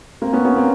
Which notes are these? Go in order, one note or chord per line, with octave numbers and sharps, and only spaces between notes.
A#3 C4
B3 C#4
B3 C#4
A#3 C4